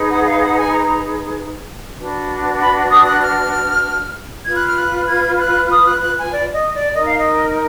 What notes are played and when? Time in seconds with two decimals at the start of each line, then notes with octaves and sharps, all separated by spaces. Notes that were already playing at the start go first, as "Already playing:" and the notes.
Already playing: D#4 G#4 B4
0.10 F#5
0.26 F5
0.41 F#5
0.52 A#5
0.57 G#5
0.73 A#5
1.98 D4 F#4 B4
2.59 B5
2.90 D#6
3.06 F#6
3.21 F6
4.46 F4 B4 G#6
4.56 F#6
4.66 F6
4.77 F#6
5.08 G#6
5.40 F#6
5.71 D#6
5.86 F#6
6.02 F#6
6.18 G#5
6.32 D5
6.54 D#5
6.74 D5
6.95 D#4 A#4 D#5
7.06 F5
7.18 D#5